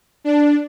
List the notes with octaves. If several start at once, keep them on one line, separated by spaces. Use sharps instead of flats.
D4